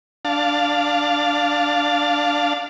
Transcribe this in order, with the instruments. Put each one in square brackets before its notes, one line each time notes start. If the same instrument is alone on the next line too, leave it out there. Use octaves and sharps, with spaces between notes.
[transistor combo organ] D4 F5 A5